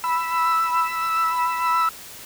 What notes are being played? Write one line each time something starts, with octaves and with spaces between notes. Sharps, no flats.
B5 E6